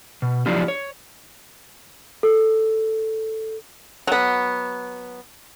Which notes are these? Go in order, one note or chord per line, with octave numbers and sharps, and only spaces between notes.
B2
F3 F#3 D4 E4 F4 G4
C#5
A4
F#3 B3